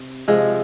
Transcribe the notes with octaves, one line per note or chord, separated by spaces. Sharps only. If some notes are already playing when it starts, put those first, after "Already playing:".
Already playing: C3
C3 F3 G#3